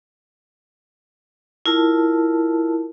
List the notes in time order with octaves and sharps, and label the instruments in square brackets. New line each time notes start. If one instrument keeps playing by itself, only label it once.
[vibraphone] E4 F4 A#4 A5